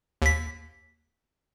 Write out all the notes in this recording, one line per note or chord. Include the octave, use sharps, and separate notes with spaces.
D#2 B6